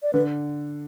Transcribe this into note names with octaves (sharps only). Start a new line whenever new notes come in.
D5
D3 B4